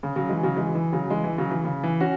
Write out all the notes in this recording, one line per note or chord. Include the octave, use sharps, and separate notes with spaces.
C#3
C#3 F#3
E3 G#3
C#3 F#3
E3 G#3
E3
C#3 F#3
E3 G#3
E3
C#3 F#3
E3
C#3
E3
C#4 F#4